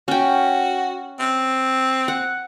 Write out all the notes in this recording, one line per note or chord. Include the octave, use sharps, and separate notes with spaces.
C#4 F#4 G5
C4
F#5